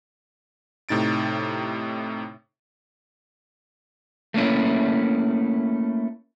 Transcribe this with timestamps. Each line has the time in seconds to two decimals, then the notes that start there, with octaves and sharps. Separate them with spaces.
0.89 A2 C3 D#4 A6 D7
4.34 A3 A#3 C#4 E4